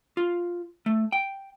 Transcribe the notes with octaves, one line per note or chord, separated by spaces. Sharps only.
F4
A3
G5